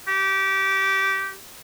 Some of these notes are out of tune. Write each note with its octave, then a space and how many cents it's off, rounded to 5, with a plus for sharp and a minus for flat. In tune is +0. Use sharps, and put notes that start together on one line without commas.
G4 -20